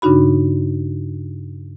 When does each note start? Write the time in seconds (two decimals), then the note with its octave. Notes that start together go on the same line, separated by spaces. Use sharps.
0.02 G2 C#3 D4 D#4 F#4 B5